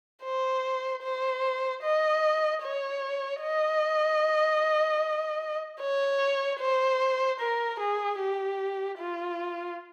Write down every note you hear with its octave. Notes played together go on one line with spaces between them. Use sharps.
C5
C5
D#5
C#5
D#5
C#5
C5
A#4
G#4
G4
F4